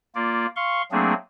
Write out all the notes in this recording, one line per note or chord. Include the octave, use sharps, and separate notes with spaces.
A#3 F4 D5
F5 C6 C#6
F#3 A3 A#3 C4 D4 G#4